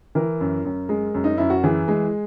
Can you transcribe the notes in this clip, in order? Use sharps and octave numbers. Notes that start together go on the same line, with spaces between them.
E3 A#4
F#2
F#2
G#3
F#2
D#4
F#2 E4
F#4
E3 G#4
G#3